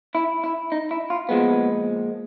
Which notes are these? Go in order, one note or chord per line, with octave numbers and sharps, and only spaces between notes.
E4
E4
D#4
E4
F4
A#2 F3 G#3 B3